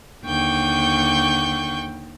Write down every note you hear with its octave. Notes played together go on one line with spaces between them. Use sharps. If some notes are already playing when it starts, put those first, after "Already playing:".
D#2 D3 G5 C#6 G6